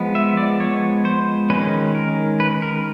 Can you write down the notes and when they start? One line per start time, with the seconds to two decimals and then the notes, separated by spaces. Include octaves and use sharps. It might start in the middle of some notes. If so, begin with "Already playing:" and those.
Already playing: F3 G#3 B3
0.15 E5
0.37 D5
0.60 C#5
1.05 C5
1.50 D#3 G#3 C#4 B4
1.95 A#4
2.40 B4
2.62 A#4